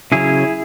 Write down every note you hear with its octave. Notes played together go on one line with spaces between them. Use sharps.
C#3 F#3 C#4 E4 G#4